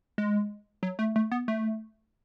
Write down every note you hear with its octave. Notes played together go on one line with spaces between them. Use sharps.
G#3
F#3
A3
A3
B3
A3